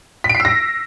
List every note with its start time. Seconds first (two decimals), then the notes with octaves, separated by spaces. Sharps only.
0.24 B6
0.29 D7
0.35 C7
0.40 E6
0.45 A#6